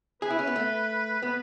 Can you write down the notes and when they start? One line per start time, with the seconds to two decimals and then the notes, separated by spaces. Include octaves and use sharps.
0.22 G#4 B4
0.30 E4
0.39 C#4
0.47 B3
0.56 A3
1.22 B3